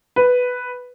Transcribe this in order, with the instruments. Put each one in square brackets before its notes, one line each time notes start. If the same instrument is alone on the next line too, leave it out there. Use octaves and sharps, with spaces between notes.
[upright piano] B4